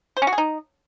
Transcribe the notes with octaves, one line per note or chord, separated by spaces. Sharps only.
C5
C#4
F#4
G#4
D#4